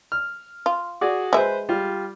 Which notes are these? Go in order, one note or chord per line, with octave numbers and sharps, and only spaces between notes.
F6
F4
F#4 G#4 D5
G#3 B4 C5 E5
G3 F4